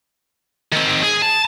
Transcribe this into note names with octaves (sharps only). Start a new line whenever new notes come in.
D#3 C4
G#4
A5